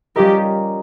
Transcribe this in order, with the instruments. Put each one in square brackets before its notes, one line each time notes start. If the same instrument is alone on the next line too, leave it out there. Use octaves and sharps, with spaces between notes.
[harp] G3 C#4 F4 A#4 D#5 [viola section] G4